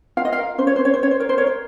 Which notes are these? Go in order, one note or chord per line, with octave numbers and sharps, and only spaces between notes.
F4 F5
D#5
F5
A#4
C#4 C5
C#5
C#4 C5
C#5
C5
C#4 C#5
C5
A#4 C#5
C5
A#4 C#5
C5